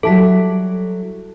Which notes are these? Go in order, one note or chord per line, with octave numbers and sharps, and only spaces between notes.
F#3 G3 E4 A4 A5 B6